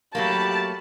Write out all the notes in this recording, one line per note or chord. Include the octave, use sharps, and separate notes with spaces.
F#3 A3 A#3 G4 A5 B5